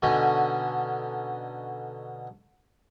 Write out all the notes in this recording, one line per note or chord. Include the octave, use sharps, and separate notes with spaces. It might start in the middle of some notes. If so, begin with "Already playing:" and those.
B2 D3 C#4 D#4